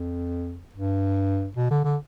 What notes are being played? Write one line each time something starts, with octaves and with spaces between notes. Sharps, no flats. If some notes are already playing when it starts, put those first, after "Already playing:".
Already playing: F2
G2
B2
D3
D3